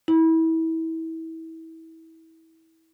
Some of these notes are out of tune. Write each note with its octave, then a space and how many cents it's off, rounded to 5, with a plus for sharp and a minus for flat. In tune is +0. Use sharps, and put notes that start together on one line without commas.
E4 -30